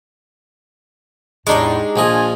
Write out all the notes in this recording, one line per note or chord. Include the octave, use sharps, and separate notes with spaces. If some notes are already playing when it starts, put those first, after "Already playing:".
E2 A2 G#3 D4 D#4 G4 C#6
A#1 F3 D4 F4 D#5 G#5